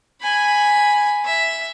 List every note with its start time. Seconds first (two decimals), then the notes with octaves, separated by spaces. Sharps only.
0.21 G#5 B5
1.25 E5